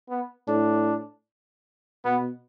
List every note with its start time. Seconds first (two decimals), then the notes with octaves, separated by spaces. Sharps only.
0.09 B3
0.48 A2 D4
2.04 B2 B3